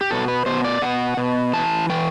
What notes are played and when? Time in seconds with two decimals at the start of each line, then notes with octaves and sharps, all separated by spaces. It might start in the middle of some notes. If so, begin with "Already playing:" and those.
0.01 G4
0.11 B2 A4
0.28 B4
0.46 B2 C5
0.65 D5
0.82 B2 F#5
1.17 B2
1.53 E3 A5
1.90 E3 G5